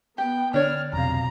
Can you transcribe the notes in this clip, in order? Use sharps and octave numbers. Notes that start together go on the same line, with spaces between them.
B3 G4 G5
D3 D4 C#5 F6
B1 F2 C3 F3 F5 A#5